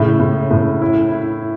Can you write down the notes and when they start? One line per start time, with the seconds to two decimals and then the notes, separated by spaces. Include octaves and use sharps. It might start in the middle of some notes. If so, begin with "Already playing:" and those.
Already playing: A2 C#3
0.19 A2
0.51 A2
0.82 E4
1.12 E4